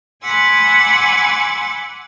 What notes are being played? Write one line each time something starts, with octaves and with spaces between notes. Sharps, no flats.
F#5 G#5 B5 C6 D6 E6